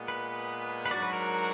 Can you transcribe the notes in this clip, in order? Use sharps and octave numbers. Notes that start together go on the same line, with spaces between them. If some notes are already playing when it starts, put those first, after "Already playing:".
Already playing: A#2 G#3 B3
B4
B4
G#2 F#3 D4 F#4 D5
B4
A#4